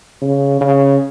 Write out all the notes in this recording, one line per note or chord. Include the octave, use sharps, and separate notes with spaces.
C#3
C#3